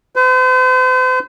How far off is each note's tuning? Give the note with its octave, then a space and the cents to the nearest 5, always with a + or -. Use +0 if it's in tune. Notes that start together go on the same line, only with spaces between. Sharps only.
C5 -45